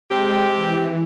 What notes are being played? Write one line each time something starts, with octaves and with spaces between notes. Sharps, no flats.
C3 G#3 C4 G4
E3